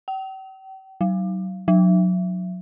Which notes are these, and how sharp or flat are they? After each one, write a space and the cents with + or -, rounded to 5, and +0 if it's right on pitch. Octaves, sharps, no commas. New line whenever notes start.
G5 -40
F#3 +30
F#3 -25